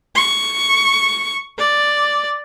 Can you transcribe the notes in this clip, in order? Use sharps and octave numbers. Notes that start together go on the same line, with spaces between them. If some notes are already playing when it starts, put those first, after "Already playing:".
C#6
D5